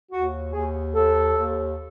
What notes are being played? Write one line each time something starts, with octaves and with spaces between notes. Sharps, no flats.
D#2 F#4
D#2 G#4
D#2 A4
D#2